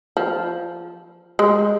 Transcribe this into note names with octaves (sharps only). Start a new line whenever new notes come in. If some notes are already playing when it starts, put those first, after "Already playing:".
F3
G#3